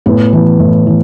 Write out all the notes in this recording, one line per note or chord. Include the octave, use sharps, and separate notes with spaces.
A2 B3
E3
A2
E3